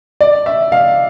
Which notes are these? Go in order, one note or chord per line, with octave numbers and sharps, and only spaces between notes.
D5
E5
F5